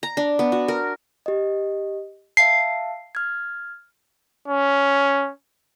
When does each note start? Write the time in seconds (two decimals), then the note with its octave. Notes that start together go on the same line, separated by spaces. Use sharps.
0.03 A#5
0.17 D4
0.39 B3
0.52 F#4
0.68 A#4
1.26 G4 D#5
2.37 E5 F5 A5 C7
3.15 F6 G#6
4.48 C#4